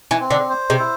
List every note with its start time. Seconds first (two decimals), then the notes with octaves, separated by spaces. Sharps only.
0.11 E3
0.20 C4
0.30 D3
0.50 C5
0.70 C3
0.79 E4